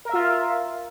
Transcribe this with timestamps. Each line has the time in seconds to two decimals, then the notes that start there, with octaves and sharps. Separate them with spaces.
0.05 A#4
0.09 E5
0.13 F4